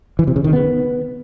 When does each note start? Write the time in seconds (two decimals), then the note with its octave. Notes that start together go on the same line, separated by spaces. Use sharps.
0.19 E3
0.27 C3
0.36 C#3
0.44 D#3
0.53 B3